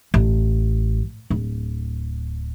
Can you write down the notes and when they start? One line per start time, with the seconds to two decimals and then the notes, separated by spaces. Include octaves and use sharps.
0.14 A1
1.30 D1